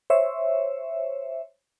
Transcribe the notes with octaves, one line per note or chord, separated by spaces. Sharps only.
C5 C#5 E5